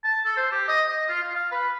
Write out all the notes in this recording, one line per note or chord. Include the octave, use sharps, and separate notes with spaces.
A5
A4
C5
G4
D#5
D#5
F4
F4
F5
B4